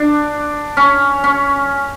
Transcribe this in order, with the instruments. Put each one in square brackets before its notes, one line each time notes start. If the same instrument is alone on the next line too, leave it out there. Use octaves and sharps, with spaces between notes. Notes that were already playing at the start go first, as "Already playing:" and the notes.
Already playing: [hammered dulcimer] D4
C#4
C#4